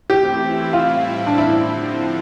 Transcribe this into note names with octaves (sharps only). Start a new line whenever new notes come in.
E3 A3 C4 E4 G4
A2 G3 C4 E4 F4
D4
D3 F3 C4 E4